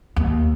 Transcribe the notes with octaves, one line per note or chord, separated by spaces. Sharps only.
D#2